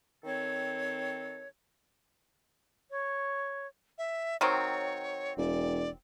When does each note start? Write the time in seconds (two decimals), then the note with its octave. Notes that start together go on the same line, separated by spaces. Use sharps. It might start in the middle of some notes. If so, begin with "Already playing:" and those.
0.24 D#3 C4 A4 C#5
2.91 C#5
3.98 E5
4.41 D#3 F#3 C4 C#5
5.37 E1 D5